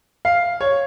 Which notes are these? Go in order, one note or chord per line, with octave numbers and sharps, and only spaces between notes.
F5
C#5